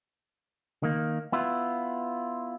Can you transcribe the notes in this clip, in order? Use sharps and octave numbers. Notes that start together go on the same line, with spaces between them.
D#3 A#3
B3 E4 F4